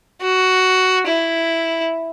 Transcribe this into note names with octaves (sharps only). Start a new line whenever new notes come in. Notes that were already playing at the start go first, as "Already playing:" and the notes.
F#4
E4